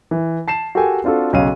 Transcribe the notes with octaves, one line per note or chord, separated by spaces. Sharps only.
E3
A5 C7 E7
F#4 G4 A4 A#4 G5 G#5
C4 D4 F4 F#4 A4
B1 C#3 C#5 F5 D#7